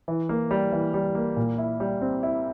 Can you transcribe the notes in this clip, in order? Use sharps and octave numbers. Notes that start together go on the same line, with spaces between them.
E3
A#3
G3
E3
G3
A#3
A#2
E4
G3
C4
E4